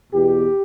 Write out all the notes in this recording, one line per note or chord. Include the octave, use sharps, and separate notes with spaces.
E2 B2 G4